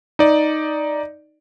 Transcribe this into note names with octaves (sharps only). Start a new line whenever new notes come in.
D#4 D5